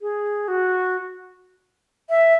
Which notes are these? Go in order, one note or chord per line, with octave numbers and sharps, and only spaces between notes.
G#4
F#4
E5